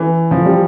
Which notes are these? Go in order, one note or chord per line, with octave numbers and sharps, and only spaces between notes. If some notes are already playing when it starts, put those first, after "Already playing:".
Already playing: E3
F3
G3